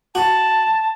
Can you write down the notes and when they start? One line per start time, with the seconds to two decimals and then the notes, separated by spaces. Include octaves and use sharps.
0.15 F#4 A5